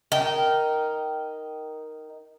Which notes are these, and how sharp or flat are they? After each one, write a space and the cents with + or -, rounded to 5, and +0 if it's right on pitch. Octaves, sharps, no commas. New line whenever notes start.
D#4 +0 A#4 +0 G5 -20